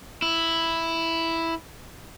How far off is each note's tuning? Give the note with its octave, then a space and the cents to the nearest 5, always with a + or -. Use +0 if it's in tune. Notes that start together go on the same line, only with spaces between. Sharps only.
E4 +0